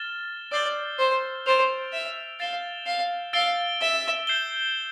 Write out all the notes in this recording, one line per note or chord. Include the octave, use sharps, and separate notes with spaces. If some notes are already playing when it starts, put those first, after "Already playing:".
Already playing: F6 A6 E7 G7
D5 E6 G6 C7 G7
C5
C5 A6 D7 F7
E5
F5 A6 E7 G7
F5
F5 E6 A6 D7 G7
E5
G6 C7 E7 G7